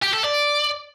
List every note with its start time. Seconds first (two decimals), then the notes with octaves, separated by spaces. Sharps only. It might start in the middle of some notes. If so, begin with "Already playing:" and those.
0.03 G4
0.13 A4
0.24 D5